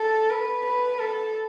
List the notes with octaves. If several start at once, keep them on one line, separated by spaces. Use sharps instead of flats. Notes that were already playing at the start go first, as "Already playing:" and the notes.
Already playing: A4
B4
B4
A4